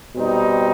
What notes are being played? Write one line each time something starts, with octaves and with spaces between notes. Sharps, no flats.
B2 G3 C4 D#4